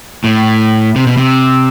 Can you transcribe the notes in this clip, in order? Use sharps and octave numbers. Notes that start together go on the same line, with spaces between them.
A2
C3
B2
C3